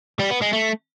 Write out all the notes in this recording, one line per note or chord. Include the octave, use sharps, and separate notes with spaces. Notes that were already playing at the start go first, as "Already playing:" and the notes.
G3
B3
G#3
A3